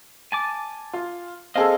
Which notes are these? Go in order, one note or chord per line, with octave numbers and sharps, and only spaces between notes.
G#5 A5 D6
F4
C4 G#4 A4 D#5 F5